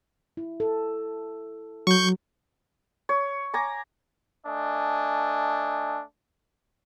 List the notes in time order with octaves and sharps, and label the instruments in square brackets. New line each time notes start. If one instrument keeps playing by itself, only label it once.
[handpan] E4
A4
[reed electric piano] F#3 [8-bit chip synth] C#6 G6
[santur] C#5
G#5 A#5 D6
[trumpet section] A3 D4 D#5 G#5